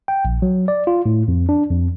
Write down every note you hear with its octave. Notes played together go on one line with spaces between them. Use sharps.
G5
A#1
F#3
D5
F4
A2
F2
D4
F2